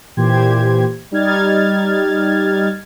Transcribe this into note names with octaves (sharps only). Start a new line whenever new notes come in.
A#2 E3 G4 C5 G#6
G3 D#4 F6 G#6 A6